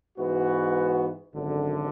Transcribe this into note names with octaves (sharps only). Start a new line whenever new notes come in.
G#2 E3 B3 F#4
G#1 F#2 D3